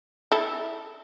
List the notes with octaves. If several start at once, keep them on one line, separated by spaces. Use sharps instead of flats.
E4 A4